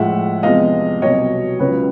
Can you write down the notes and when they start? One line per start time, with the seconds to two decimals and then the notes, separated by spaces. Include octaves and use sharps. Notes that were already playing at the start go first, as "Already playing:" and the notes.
Already playing: A2 F3 G#3 E5 F#5
0.43 E2 C3 F3 G#3 D#5 F5
1.01 C2 B2 F#3 C#5 D#5
1.59 C#2 C#3 F#3 B4 C#5